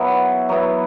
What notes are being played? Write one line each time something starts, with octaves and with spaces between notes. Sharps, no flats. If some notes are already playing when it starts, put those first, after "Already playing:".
Already playing: F#3 B3 E4
F#3 B3 E4